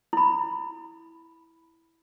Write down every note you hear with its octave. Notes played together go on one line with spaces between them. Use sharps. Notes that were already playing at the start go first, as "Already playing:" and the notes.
E4 B5